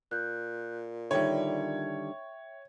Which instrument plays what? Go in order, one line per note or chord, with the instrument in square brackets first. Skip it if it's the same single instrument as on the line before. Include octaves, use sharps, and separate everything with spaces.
[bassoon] A#2 [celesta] F#6 G6
[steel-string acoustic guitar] D3 D#3 G3 [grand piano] C#5 [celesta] E5 G5